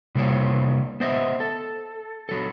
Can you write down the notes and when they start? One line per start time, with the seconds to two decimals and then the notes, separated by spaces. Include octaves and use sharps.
0.15 C3 G3 A#3 F4 C#5
1.00 B3 C5 D#5 E5
1.40 A4
2.29 F#3 A4